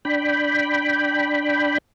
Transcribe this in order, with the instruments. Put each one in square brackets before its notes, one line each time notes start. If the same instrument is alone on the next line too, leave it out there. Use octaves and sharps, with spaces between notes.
[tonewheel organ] D4 G5 B5